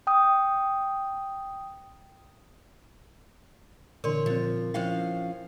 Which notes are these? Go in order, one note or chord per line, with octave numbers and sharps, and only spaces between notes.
G5 D#6
A#2 D3 E3 A#4 C#5 D5 C6
A#2 F3 C4
F3 C#4 E4 C5 E5 F5 G5